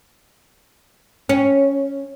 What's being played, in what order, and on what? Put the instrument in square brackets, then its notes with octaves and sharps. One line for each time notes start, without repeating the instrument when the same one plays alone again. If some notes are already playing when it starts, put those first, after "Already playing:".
[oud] C#4